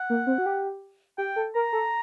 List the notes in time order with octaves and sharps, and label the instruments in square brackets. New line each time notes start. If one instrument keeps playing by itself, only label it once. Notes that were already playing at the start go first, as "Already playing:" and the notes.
Already playing: [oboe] F#5
[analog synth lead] A#3
C4
F#4
G4
[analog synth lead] G4 [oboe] G5
[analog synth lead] A4
[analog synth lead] A#4 [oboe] A#5
[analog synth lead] A4